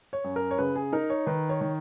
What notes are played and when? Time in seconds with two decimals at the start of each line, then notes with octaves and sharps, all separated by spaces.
0.13 C#5
0.24 F#2
0.36 A#4
0.51 C#5
0.58 C#3 B4
0.76 G#4
0.93 D#4 A#4
1.10 C#5
1.27 D#3 B4
1.49 C#5
1.61 D#3